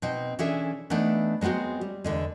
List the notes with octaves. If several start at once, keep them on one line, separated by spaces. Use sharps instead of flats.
B2 C4 D#4
E3 C#4 D4 G#4 A4 E5
E3 A3 B3 D4 D#4
F#3 G#3 B3 C4 F#4
G3
E2 D3 G#3